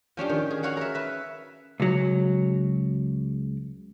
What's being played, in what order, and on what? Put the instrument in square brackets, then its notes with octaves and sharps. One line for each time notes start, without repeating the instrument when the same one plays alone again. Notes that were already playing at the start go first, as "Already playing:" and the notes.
[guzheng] F3 C#4 D4 G4
D#3
G#4
F#4 G#4 C#5 F5 F#5
A#4 E5
B4 E5 B5
[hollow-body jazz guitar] C#2 F#3